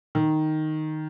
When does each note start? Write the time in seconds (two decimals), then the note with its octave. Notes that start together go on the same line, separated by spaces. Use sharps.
0.15 D#3